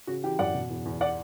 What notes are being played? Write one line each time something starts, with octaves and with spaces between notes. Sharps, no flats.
C#3 F#4
E3 G4
F#2 D5 F#5
B2
E2
E2
D5 F#5